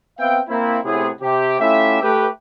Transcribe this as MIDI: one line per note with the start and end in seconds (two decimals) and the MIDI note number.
0.20 0.39 59
0.20 0.39 60
0.20 0.39 76
0.20 0.39 77
0.20 0.39 79
0.48 0.79 58
0.48 0.79 60
0.48 0.79 64
0.84 1.09 45
0.84 1.09 48
0.84 1.09 59
0.84 1.09 68
1.21 1.60 48
1.21 1.60 67
1.60 2.00 57
1.60 2.00 61
1.60 2.00 64
1.60 2.00 65
1.60 2.00 67
1.60 2.00 76
2.02 2.27 57
2.02 2.27 67
2.02 2.27 71